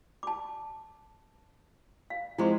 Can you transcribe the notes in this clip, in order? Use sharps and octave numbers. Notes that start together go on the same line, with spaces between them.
A5 D6
F5
F3 G#3 C4 E4 G#4 C6